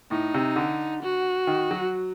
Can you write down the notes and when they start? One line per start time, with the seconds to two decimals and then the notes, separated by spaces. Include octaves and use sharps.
0.11 A2 D#4
0.34 C3
0.56 D3
1.03 F#4
1.47 D#3
1.71 F#3